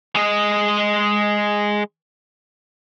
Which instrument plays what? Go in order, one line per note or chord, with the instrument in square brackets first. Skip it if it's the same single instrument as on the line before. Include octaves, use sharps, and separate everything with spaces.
[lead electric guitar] G#3 D#5